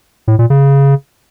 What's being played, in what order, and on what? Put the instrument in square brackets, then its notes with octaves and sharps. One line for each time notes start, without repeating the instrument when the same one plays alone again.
[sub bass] A2
A#2
C#3